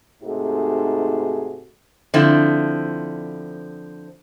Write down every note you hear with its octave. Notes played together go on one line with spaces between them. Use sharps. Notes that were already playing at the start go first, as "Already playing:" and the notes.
G#2 C3 A3 D#4 F#4 G#4
D3 F3 C4 E4